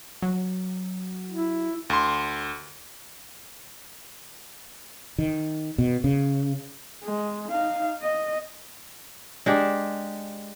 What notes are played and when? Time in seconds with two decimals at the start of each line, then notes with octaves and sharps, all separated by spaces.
0.22 F#3
1.30 E4
1.90 D2 C6
5.18 D#3
5.78 B2
6.04 C#3
7.04 G#3
7.50 D#4 F5
8.01 D#5
9.46 G#3 D4 G4